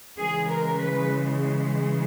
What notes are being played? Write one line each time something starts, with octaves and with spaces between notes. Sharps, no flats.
C#3 E3 G#3 G#4
A#4
B4